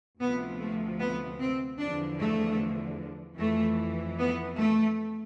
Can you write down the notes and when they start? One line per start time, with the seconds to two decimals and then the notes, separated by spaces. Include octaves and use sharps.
0.20 D2 C3 F3 B3
0.59 A3
0.99 B3
1.39 C4
1.79 E2 D3 F3 D4
2.19 A3
3.38 F2 E3 A3
4.18 B3
4.57 A3